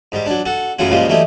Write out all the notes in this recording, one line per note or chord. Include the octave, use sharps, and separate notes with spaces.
G#2 G3
F#3 D4
F#4 A4
F#2 A2 C#3 F#3 F4 F#4
A#2 C#3 F3 G3 G#3
E3 F#3 G3 A3 D#4